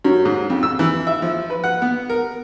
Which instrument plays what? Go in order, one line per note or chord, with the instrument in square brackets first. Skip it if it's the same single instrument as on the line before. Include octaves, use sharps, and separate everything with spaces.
[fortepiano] F#2
G#2
F2
E6
E3
E5
F3
B4
F#5
B3
A#4